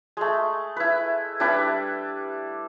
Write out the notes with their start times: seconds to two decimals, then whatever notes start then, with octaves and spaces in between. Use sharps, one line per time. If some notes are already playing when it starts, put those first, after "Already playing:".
0.17 G#3 A3
0.76 E4 B4
1.40 G3 D4 E4 B4